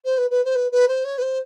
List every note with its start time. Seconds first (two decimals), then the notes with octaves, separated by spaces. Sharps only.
0.05 C5
0.18 B4
0.31 B4
0.45 C5
0.55 B4
0.72 B4
0.88 C5
1.05 C#5
1.18 B4
1.22 C5